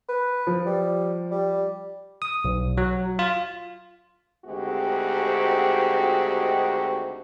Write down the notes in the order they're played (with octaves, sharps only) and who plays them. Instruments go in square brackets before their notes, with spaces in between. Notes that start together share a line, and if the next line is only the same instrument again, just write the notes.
[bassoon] B4
[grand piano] F3
[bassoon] G3
G3
[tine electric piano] D#6
B1
F#3
F4
[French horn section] D2 D#3 G#3 C4 F#4 G4